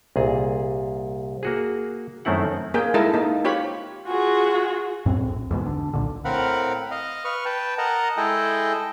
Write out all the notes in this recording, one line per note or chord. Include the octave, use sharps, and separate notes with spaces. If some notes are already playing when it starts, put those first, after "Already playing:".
C2 A#2 G#4
A#3 F#4 G#4
F#2 D#3 A3 C4 E4 F#5
A#3 G#4 A#4 G5
G#3 E4 A4 A#4 D#5 A5
A#3 D#4
F4 G4 C#5 B5
F4 F#4 G#4
F#2 A2 C4
A#1
E2 G#2 B2
D3
B1 A#2 D3
A2 C4 A#4 F5 F#5 B5
D#5 F5
B4 C#6 F6
B4 G5 A5
A#4 D#5 F#5 A5 A#5
G#3 E4 G#4 A4 D#5 G5